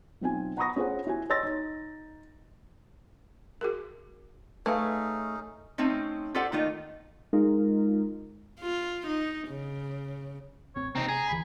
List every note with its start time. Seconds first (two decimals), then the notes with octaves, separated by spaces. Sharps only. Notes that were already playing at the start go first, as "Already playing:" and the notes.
0.21 B1 C4 F4 G#5
0.57 F#5 A#5 B5 C#6 D#6 A#6
0.76 C#4 F4 G#4 C5 C#5 F#5
1.07 E4 F#4 G#5
1.30 C#5 D#5 C6 E6 A6 A#6
1.43 D#4
3.61 F#4 G#4 A#4
4.66 A3 C#4 D#4 G#4 B4 E5 F5
5.78 A3 C4 C#4 D#4
6.35 F4 G4 A4 C5 D5 F#5
6.52 D#3 A3 A#3 D#4 F4
7.33 G#3 D#4 F4 A#4
8.60 F4
9.06 D#4
9.49 C#3
10.76 A1 C4 C#5
10.95 C3 C4 D#4 A#5
11.09 G#4
11.29 G#1 D2 E3 B5